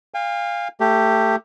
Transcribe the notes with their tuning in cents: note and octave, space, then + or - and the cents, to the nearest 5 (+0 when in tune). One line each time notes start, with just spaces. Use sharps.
F5 +0 G#5 -45
A3 +20 G4 +0